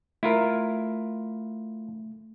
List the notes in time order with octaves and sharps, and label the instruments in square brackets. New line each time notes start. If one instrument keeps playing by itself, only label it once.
[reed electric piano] A3 [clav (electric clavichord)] E4 F4 A#4